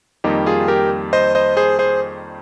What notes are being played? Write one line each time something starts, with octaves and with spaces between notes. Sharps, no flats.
F2 D#3 G3 A#3 D#4 G4
F4 G#4
G4 A#4
C5 D#5
C5 D#5
G#4 C5
G#4 C5